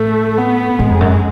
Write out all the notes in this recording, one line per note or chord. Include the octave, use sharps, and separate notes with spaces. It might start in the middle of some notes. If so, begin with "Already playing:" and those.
Already playing: A2 A3
B3
A2 G#3
F2
F#2